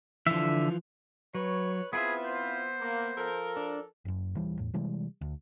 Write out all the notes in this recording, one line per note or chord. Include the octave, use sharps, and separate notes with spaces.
D3 E3 F3 F4 E5
F#3 B4 C#5
B3 C4 E4 F4 G#4 B4 E5
C5
A#3
F3 A4 A#4
D4
F#1 F#2
D#1 E3 G3
E2 A2
C3 E3 G3 G#3
D2